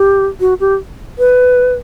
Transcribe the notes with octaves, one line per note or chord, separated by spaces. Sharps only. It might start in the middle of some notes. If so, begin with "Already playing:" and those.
Already playing: G4
F#4
G4
B4